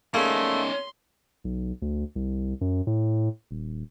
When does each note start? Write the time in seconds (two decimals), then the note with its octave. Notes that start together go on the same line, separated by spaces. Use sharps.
0.14 A3 A#3 C#4 D#4 G#4 C6
1.44 B1
1.82 D2
2.15 C2
2.61 F#2
2.87 A2
3.51 D#1